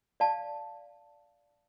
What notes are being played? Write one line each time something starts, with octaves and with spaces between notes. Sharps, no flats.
D5 F5 A5